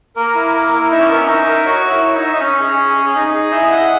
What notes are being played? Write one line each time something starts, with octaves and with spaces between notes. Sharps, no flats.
A#3 A#4
E4
A#4
E4
D#4 E5
C#4
B3 A#4
C#4
D#4 E5
A#4
F#4 C#5
C#5
E4
C#5
D#4
E5
D#4
C#4 C#5
G#4
G#4
G#4
C#4
D#4 G#4
G#4
E4 D#5
F#5